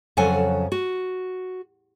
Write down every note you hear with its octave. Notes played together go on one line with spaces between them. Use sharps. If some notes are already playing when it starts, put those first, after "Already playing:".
F2 C#3 F#3 A4 F#5 G#5
F#4